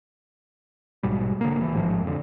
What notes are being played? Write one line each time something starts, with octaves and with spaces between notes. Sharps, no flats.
A#1 G#2 B2 G3
D3 A#3
D2 E3
A1 G#2 D3 F3
F2 D3